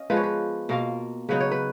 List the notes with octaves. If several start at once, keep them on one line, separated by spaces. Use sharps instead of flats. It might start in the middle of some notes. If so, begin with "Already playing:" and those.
Already playing: C#4 D#5 F5
F3 G#3 B3 F4 B4
C#5
B4
B2 A#3 F4 A#4
C#3 F#3 B3 D#4 B4
C#5
B4